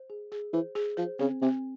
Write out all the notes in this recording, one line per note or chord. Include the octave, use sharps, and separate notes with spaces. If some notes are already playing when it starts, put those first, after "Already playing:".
Already playing: C5
G#4
G#4
E3 C5
G#4
F3 C5
C#3 C4
C3 C4